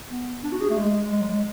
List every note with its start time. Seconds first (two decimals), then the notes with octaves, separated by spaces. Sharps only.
0.09 B3
0.43 D4
0.52 F#4
0.61 G#4
0.69 A3
0.77 G#3
1.12 G#3
1.21 F#3
1.29 G#3